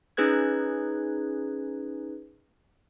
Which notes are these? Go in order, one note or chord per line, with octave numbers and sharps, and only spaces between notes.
C#4 D#4 G#4 B4 F#6 G#6